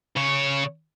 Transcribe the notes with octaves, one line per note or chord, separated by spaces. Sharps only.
C#3 C#5